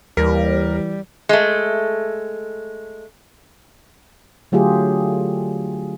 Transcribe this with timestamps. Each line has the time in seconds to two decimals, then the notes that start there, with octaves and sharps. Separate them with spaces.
0.17 D#2 E3 G3 A#4
1.29 G#3 A3
4.52 D3 F#3 A3 F4 G4 G#4